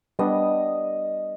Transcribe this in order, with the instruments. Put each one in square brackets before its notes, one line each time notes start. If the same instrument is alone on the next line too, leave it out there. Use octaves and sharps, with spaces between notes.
[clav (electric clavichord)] G3 B3 D4 [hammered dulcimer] D#5